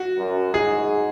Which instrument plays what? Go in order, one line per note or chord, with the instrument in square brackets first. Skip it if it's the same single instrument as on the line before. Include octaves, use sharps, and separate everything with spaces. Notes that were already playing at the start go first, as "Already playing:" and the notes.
Already playing: [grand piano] F#4
[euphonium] F#2
[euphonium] G#2 [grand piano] G#4